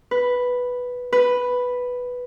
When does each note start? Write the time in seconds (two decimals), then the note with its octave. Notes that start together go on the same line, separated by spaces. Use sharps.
0.11 B4
1.13 B4